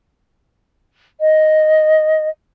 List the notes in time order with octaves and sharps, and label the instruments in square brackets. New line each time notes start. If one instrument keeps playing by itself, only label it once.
[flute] D#5